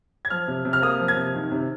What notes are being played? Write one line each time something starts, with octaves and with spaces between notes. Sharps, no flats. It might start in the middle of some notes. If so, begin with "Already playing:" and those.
G#6
F3 F6
C3
C3
F6
A#3 D#6
F3
G#6
C3
D#3
C3